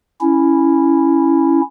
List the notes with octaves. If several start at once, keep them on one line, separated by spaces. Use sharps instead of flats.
C#4 E4